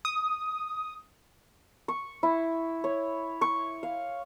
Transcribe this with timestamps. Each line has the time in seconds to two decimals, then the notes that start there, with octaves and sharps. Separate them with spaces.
0.05 D#6
1.88 C#6
2.23 E4
2.84 C#5
3.41 C#6
3.83 F5